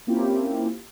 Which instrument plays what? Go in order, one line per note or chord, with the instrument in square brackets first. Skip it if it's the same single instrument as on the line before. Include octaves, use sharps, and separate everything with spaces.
[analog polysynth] A#3 C4 C#4 E4 F4 G4